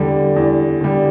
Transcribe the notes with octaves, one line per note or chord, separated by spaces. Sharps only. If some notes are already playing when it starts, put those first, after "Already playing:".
Already playing: E2 D3 G3
E2
D3 G3